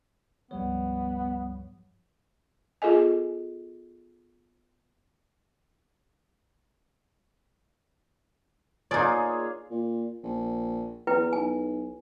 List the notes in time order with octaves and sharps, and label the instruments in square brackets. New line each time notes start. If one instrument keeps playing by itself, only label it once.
[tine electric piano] C#2 G3 C#5 [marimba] G2 F3 [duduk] B3
[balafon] B3 F4 G#4 A4 D#5 G#5
[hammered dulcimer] A#3 F4 G#4 [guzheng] D#4 D5 [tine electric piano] C#5
[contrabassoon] A#2
A#1
[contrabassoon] E2 [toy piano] E4 B4 G5
[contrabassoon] B1 [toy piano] G#5